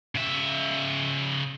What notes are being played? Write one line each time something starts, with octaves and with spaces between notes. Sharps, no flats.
C#3 E5